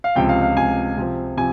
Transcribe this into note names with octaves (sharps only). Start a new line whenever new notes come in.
F5
C#2 C3 F3 G5
F5
F5
C#2 C3 F3 G#5
C3 F3 C4
C3 F3 G#5